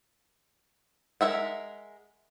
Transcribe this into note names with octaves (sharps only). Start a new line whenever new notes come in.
G#3 A#4 E5 F#5